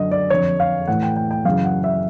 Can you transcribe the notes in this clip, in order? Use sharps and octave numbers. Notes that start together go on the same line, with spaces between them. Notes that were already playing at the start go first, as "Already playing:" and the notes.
Already playing: F#2 D3 D#5
D5
F2 D3 C#5
F5
A2 E3 F#5
G5
G5
G5
F#2 C#3 E3 F5
F#5
E5